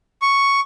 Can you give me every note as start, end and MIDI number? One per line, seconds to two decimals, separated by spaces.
0.22 0.60 85